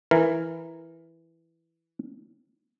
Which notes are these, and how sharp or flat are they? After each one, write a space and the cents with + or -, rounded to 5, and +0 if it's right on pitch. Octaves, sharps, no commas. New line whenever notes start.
E3 +0 A#4 +0